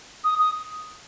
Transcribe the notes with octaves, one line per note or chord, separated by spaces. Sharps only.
D#6
D#6